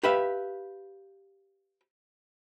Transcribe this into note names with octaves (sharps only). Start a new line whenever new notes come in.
G4 B4 E5 F5